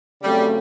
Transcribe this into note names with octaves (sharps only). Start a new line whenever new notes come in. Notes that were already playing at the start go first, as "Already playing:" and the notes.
C#3 F#3 G3 A3 C4